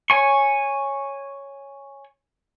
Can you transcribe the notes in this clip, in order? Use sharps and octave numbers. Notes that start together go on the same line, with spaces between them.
C#5 G#5 C#6